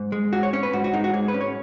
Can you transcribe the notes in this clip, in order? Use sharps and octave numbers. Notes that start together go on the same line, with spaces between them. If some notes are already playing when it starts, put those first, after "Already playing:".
Already playing: G#2
G#3
G#2 F#4
C#5
C#4 C#5
B4
G#2 F#4
F#4
G#3 D#4
F#4
G#2 G#4
B4
C#4
C#5